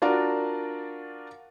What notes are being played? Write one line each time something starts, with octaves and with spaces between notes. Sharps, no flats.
D4 F4 F#4 A#4 D5